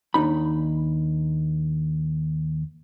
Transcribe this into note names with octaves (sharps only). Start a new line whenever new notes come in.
D#2 D4 D#4 B5